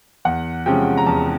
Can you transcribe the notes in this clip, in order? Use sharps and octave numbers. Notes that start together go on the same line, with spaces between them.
E2 F#5
C3 F3 G#3 C#4 G5
A#5
E2 A5